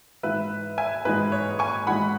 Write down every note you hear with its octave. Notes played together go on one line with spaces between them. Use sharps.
G#2 E3 G#3 B4 E5
E5 G#5
G#2 E3 G#3 B4
C#5
G#5 C#6
G#2 E3 G#3 F#5 B5